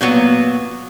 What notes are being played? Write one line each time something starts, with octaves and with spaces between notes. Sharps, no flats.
A#2 F#3 B3